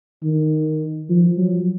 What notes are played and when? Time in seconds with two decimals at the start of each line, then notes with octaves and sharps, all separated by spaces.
0.23 D#3
1.10 F3
1.38 F#3